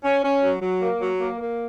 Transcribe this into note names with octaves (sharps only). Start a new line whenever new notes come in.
C#4
C#4
F#3
F#3
A#3
F#3
A#3
A#3